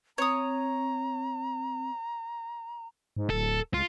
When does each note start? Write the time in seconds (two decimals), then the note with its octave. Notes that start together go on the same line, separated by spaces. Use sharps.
0.18 C4 C#5 A#5 D#6
3.17 G#2
3.30 D1 A4
3.74 C#2 F4